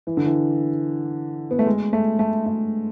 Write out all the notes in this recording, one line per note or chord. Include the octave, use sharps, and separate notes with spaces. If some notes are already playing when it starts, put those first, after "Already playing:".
E3
D3
E3
B3
A3
G#3
A3
A3
A3